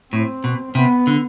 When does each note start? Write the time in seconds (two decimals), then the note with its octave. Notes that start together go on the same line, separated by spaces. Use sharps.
0.13 A2 C4
0.44 B2
0.75 C3 B3
1.07 D3